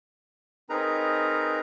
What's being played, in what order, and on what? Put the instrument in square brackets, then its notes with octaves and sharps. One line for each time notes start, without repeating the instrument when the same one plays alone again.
[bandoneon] C4 G#4 A#5 [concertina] D#4 A#4 B4